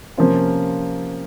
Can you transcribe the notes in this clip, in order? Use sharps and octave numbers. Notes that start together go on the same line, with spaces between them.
C3 F3 A#3 C#4 F4